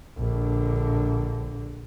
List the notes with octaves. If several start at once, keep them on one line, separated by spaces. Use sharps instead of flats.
A#1 D3